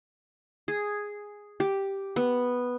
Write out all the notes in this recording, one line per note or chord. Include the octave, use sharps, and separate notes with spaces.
G#4
G4
B3